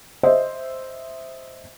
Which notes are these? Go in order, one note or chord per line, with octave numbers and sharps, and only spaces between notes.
C5 D#5 E5